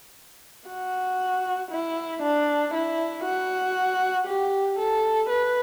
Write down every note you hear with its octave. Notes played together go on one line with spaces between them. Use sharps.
F#4
E4
D4
E4
F#4
G4
A4
B4